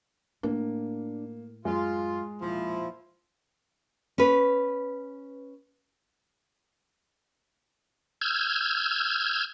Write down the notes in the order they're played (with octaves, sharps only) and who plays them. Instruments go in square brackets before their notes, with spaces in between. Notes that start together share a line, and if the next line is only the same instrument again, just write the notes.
[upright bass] A2 [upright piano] A#3 [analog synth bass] D4
[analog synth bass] F#2 [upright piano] G#3 [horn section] F4
[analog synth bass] E1 [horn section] A#2 F3 E4
[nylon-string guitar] C#4 B4
[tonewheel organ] E6 F6 G6 G#6